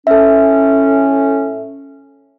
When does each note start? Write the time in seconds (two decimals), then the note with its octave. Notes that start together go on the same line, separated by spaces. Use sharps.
0.07 A2 C#4 A4 E5